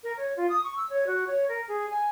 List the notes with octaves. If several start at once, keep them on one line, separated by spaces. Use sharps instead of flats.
A#4
C#5
F4
D#6
C#6
E6
C#5
F#4
C#5
A#4
G#4
G#5